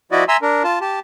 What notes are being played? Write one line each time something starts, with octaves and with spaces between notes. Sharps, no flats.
F3 E4 F#4 D5 D#5
E5 G#5 A#5 C6 E6
D4 A#4
F4 A5
G4 A5